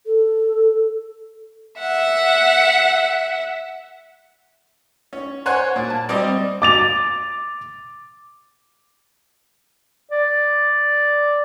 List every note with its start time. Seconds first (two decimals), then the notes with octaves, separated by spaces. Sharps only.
0.06 A4
1.79 E5 F#5
5.13 C#4
5.46 C5 C#5 F#5 G#5
5.76 A#2
5.90 A5
6.09 G3 C4 D5 D#5
6.62 D6 A6 F7
10.11 D5